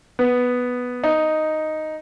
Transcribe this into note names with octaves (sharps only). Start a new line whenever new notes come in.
B3
D#4